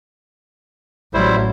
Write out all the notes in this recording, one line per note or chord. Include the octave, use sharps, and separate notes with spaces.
A1 F#3 G3 E4 C5